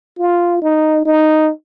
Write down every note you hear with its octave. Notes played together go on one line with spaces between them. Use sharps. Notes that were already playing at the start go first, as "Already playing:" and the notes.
F4
D#4
D#4